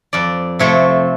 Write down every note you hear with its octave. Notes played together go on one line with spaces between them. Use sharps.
F2 D5
C3 F3 A3 C4 C#5